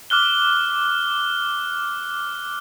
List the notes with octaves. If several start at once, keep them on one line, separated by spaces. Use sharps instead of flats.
D6 F6 F#6 G7